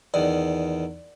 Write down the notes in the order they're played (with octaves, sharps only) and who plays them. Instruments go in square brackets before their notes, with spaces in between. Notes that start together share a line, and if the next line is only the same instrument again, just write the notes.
[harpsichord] E2 D#3 [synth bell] D5